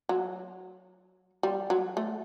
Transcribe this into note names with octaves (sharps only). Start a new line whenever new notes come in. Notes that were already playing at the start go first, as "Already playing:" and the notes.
F#3
G3
F#3
A3